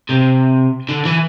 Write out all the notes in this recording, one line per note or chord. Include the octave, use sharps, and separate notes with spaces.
C3
D3
E3